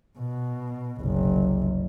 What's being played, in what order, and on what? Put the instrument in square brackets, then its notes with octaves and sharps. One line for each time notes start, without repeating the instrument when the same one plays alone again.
[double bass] B2
F#1 C2